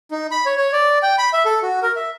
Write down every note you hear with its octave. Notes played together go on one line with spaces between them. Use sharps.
D#4
B5
C#5
C#5
D5
G5
B5
E5
A4
F#4
A#4
E5